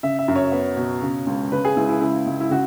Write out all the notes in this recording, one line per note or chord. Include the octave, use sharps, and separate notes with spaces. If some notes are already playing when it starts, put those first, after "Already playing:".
C#3 E5
E5
F#2
C#5
B3
B2
C#3
C#2
C#3 B4
G#4
C#2 E4
E4
C#3 E4
C#2
E4
C#3 F#4